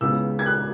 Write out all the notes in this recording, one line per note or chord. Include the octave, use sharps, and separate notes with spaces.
C#2 C#3 E3 G#3 B3 E6
G#6
F#6